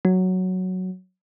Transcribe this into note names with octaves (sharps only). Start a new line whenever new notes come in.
F#3